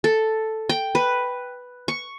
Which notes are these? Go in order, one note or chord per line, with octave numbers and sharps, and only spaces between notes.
A4
G5
B4
C#6